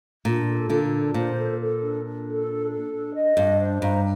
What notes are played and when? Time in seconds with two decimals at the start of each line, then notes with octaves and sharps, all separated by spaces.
0.25 A#2 D4
0.48 A4
0.70 A#2 D3 A4
0.92 D4
1.14 A#2 C5
1.36 A4
1.58 A4
1.81 D4
2.04 D4
2.26 A4
2.48 D4
2.70 A4
2.92 D4
3.15 D#5
3.37 G2 D4
3.59 C5
3.82 G2 A#5